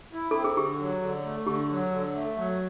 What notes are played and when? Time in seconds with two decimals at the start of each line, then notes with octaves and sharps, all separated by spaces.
0.13 E4
0.31 C4 A4
0.44 G#4
0.57 D3 G4
0.80 F#3
1.02 D3
1.25 A3
1.46 D3 G4
1.70 F#3
1.91 D3
2.15 A3
2.37 F#3